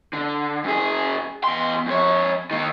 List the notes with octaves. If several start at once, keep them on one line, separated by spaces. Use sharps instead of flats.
D3
F#2 G#4
E2 C6
F2 C#5
D#3 A#3